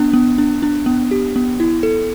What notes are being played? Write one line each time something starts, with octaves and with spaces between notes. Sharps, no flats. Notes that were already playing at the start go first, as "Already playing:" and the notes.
Already playing: B3 D4
B3
D4
D4
B3
G4
B3
E4
A4